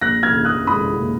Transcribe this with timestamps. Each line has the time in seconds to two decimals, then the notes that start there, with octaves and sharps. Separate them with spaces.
0.01 A#1 F#6 A#6
0.23 F6 G#6
0.34 A#1
0.45 D#6 F#6
0.67 G#3 B5 D#6
1.00 A#2